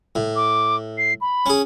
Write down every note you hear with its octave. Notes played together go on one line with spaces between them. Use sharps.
A2
D6
C7
B5
C#4 G#4